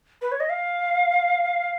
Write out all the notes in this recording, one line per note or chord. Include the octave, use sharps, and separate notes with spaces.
B4
C#5
D#5
F5